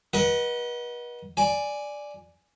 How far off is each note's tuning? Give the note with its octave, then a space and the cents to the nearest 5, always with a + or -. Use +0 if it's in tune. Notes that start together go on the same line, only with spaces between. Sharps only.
B4 -40 D#5 +0 F#5 +0
D5 +0 G#5 +0